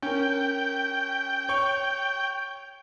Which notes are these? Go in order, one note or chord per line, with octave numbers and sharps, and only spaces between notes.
C#4 A#4 G5
C#5 C#6